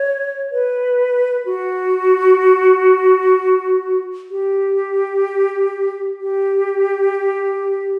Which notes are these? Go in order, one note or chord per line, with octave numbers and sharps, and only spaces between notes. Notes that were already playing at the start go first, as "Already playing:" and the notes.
Already playing: C#5
B4
F#4
G4
G4